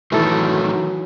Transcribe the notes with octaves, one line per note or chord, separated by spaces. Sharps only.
A2 D#3 E3 F#3 A3 A4